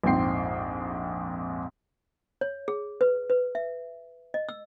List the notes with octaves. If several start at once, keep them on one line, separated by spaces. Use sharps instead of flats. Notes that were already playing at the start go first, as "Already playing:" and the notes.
A#1 F2 G#2 C4 G5 C7
C#5
G#4
B4
B4
E5
D#5
E6